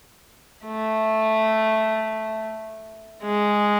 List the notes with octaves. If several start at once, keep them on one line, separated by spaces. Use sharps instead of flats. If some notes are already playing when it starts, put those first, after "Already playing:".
A3
G#3